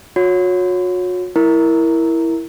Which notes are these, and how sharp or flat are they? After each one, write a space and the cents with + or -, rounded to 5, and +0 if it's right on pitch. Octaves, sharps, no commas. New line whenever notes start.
F#4 -40 C#5 +0
E4 +0 A#4 +0